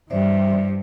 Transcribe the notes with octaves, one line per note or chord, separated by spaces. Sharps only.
G2 E3 G3 C5 D5 E5